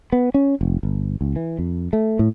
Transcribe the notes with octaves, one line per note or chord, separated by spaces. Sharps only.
B3
C#4
F1
G1
C#2
E3
F2
A3
A2